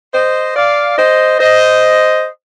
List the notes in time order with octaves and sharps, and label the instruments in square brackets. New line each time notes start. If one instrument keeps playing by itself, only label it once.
[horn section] C5 D#5
D5 F5
C5 D#5
C5 D#5